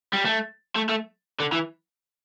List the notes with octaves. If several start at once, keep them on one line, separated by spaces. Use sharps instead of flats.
G3
A3
A3
A3
D3
E3